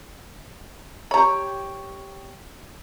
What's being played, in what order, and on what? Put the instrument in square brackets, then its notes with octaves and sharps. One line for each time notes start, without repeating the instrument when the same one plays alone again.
[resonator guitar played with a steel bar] G4 C#5 [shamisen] A#5 B5